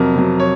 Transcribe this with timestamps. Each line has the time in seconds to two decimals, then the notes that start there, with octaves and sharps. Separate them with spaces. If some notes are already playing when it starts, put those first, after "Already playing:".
Already playing: F2 C3 F#3 A#4
0.15 C3 F#3
0.40 C#5